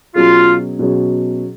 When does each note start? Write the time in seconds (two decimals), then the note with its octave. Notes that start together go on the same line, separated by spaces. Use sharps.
0.15 B2 F#3 C#4 F4 G#4
0.79 B2 F#3 C#4 G#4